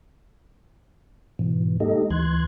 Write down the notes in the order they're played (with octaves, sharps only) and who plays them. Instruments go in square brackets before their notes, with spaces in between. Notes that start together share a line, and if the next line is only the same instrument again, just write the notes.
[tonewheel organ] G#2 B2 E3
G#3 A#3 D#4 G4 A4 D#5
D2 E3 C6 F#6 G#6